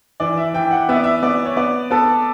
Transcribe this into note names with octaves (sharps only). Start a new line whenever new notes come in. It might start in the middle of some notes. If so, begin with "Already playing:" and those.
E3 D5
E5
E3 G5
F#5
B3 E5
D5
E5
B3 D5
C#5
B3 D5
B3 A4